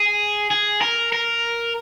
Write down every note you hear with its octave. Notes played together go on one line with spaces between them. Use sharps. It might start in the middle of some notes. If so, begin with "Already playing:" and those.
Already playing: G#4
G#4
A#4
A#4